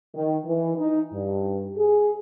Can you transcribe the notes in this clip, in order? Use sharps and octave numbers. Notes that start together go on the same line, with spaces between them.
D#3
E3
D#4
G2
G#4